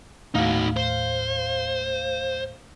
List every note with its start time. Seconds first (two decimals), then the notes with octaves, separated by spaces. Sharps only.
0.35 D#2 A2 D#4 F#4 F5
0.77 C5